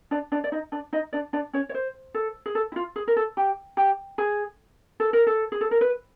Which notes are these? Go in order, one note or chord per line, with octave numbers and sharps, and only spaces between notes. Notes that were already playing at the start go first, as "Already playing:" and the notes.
D4 D5
D4 D5
D5
D#4 D#5
D4 D5
D#4 D#5
D4 D5
D4 D5
C#4 C#5
C#5
C5
A4
G#4
A4
E4
F4
G#4
A#4
A4
G4
G4
G#4
A4
A#4
A4
G#4
A4
A#4
B4